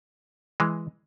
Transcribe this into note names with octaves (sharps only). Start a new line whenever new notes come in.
E3 G#3